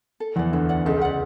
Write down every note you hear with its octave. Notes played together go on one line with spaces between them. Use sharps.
A4
E2 E3 D5 F#5
D2 D3 A4
D5 F#5
C#2 C#3 A4
C#2 C#3
D5 F#5